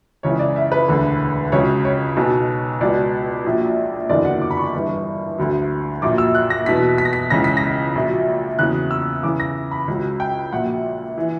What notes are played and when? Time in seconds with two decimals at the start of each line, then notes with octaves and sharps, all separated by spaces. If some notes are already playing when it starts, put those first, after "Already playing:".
0.23 C#2 C#3 E3 C#5
0.39 D5
0.56 E5
0.72 B4
0.88 E1 D2 D3
1.52 C#2 C#3 F#3 C#5
1.85 C#5
2.16 B1 B2 F#3
2.81 C#2 B2 F#3 D5
3.44 A#1 A#2 F#3
4.09 F#1 E2 D3 F#3 D5
4.25 F#5
4.41 D6
4.51 B5
4.57 C#6
4.74 G1 G2 E3
5.38 D2 D3 F#3
6.02 A#1 A#2 F#3 D6
6.18 E6
6.35 F#6
6.50 A#6
6.66 E2 B2 F#3 B6
6.98 B6
7.05 A#6
7.13 B6
7.30 C#2 C#3 E3 A#6
7.44 B6
7.57 A#6
7.95 A#1 A#2 F#3
8.59 E2 C#3 F#3 F#6
8.91 E6
9.23 E2 C#3 E3 D6
9.40 A#6
9.71 B5
9.88 C#2 C#3 F#3
10.20 G5
10.53 A#1 A#2 F#3 F#5
11.18 E3